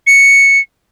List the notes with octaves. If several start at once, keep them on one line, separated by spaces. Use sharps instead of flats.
C#7